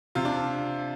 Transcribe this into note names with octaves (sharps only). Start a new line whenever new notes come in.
C3 F4
D4